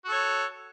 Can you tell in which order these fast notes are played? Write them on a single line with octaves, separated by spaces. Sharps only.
F#4 A4 C#5